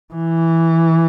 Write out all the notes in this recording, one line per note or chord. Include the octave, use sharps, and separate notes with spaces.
E3